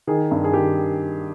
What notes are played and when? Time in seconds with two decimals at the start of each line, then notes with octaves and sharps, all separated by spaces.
0.07 D#3 G#4
0.31 G2
0.44 G#4
0.53 D#3 G4